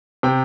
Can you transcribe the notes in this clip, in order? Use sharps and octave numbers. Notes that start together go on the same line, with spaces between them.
C3 G5